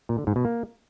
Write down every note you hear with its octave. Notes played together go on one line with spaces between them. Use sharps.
A#2
D3
G#2
B2
A#3